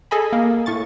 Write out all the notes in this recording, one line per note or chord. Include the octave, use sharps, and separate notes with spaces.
G#4 A4 D#5 G#5 B5
A#3
A2 C#6 A6